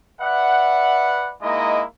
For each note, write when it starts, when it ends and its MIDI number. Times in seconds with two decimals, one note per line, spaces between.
0.21 1.34 71
0.21 1.34 74
0.21 1.34 76
0.21 1.34 78
1.43 1.84 56
1.43 1.84 58
1.43 1.84 63
1.43 1.84 64
1.43 1.84 75